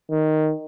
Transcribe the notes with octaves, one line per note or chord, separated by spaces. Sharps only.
D#3